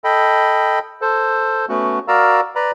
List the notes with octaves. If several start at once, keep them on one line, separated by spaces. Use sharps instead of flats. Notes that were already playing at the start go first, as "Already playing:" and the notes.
A4 D#5 G5 B5
A4 C5
A3 B3 C#4 F#4
F#4 A#4 D5 F5 A#5 E6
B4 D5 A#5 B5